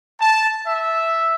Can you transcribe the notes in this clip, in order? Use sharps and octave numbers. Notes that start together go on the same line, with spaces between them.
A5
E5